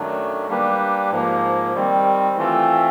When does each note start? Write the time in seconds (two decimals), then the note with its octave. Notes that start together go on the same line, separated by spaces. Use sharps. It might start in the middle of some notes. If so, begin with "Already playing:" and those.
Already playing: F#2 D#3 F#3 A3 D4
0.48 G3 A#3 D4 G4 B4
1.10 G#2 F3 A#3
1.74 D#3 G3 C4
2.36 E3 A3 C4 F4 A4